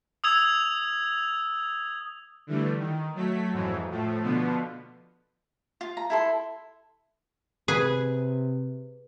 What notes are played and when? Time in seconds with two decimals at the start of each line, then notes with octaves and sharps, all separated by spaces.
0.24 D#6 E6 G#6 F7
2.47 D3 E3 G3 A3
2.79 D#3
3.15 F#3 A3 B6
3.52 F2 G#2 E3 F#3
3.91 A2 F3 A3
4.23 B2 D3 F3 B3
5.81 F4
5.97 A#5
6.10 E4 A4 C6
7.68 C3 G#4 B4